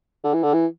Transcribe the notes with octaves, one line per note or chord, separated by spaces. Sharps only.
D3
E3
D3
E3